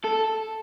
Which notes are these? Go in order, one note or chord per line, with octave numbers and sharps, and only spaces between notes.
A4